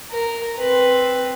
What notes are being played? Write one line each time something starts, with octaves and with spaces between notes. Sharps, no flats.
A#4
C4 B4